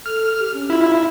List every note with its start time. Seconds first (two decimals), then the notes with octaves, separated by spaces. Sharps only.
0.06 A4 F6
0.40 G4
0.54 C#4
0.70 E4 F4